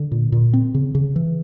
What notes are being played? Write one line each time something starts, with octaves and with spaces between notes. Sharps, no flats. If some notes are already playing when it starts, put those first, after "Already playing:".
Already playing: D3
A#2
A#2
C4
C#3
C#3
E3